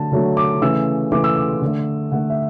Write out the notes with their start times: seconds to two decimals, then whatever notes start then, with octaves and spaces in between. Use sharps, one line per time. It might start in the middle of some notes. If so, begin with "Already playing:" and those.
Already playing: D3 F#3 A3 A5
0.12 D3 F#3 A3
0.37 D6
0.61 C#3 E3 A3 E6
1.12 C#3 E3 A3 D6
1.24 E6
1.36 D6
1.62 D3 A3
2.12 D3 A3 F#5
2.30 E5